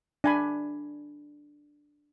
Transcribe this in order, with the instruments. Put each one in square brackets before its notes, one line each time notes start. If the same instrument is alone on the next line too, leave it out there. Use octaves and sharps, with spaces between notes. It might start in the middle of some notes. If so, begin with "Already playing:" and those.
[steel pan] D4 G#5 B5